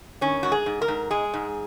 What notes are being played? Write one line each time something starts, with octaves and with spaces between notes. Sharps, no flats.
D#3 C#4
G#2 F#4
G#4
G#2
A#4
G#2
G#3 G#4
G#2